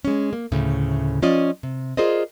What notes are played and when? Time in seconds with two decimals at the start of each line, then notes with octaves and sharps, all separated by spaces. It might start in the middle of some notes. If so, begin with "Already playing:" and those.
0.05 G#3 C#4
0.33 A#3
0.52 D2 A2 C#3
1.22 F3 C#4 F4 D5 D#5
1.63 C3
1.97 F4 G#4 A#4 C5 D5 D#5